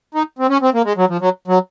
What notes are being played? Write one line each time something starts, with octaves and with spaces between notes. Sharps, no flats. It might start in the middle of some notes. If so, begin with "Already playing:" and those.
D#4
C4
C#4
C4
A#3
G#3
F#3
F3
F#3
F#3